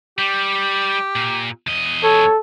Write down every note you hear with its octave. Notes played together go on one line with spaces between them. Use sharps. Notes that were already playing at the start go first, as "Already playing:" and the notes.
G3 G4
A#2
E2 D#5
A4 C#5